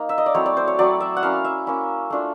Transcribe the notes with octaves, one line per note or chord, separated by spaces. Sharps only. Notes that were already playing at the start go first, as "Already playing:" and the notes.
Already playing: A#3 D#4
E5
D#5
D5
F#3 A3 C4 E4 C#5
D5
C5
C#5
F#3 A3 C4 E4 D5
E5
F#5
A#3 C#4 E4 F5
E5
A#3 C#4 E4
A3 D4 F4